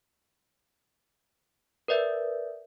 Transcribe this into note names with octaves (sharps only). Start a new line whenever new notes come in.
A#4 B4 D5 E5 G6